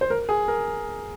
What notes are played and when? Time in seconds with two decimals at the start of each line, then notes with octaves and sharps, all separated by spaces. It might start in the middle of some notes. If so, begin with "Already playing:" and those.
0.01 C5
0.10 A#4
0.29 G#4
0.48 A#4